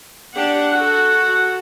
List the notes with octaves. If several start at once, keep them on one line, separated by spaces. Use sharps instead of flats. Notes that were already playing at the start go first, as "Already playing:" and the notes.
D4 G4 F#5
F#4 A4 F#5